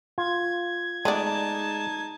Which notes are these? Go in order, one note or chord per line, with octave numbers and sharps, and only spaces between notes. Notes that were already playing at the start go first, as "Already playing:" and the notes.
F4 G#6
G#3 A3 B3 D#4 D5 A5